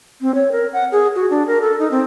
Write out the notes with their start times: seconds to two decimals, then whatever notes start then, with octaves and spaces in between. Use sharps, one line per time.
0.21 C4
0.35 C#5
0.52 A#4
0.73 F#5
0.92 G#4
1.15 F#4
1.30 D4
1.47 A#4
1.61 A4
1.79 D#4
1.91 C4